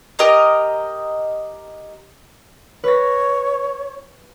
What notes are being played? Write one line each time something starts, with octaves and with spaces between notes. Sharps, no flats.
G4 A#4 D#5 A#5
B4 C#5 A#6